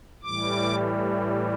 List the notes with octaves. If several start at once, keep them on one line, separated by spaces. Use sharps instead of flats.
A2 E3 G3 D6